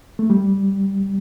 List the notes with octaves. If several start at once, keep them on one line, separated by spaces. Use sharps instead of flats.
A3
G3